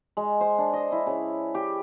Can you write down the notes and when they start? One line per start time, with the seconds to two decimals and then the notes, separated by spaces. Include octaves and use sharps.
0.17 G#3
0.41 C5
0.58 D4
0.73 D#5
0.92 E4
1.07 C#3
1.55 G4